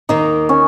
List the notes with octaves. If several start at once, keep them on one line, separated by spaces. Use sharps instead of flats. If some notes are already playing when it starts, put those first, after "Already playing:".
D#2 D#3 A#3 D#4
C#4